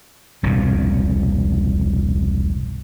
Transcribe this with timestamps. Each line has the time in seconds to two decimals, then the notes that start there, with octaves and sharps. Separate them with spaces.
0.43 E1 C2 G2 A#2